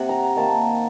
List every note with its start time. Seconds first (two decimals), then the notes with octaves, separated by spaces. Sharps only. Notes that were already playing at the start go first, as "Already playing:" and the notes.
Already playing: C3 F#5
0.09 A#5
0.36 D#3 A#3 A5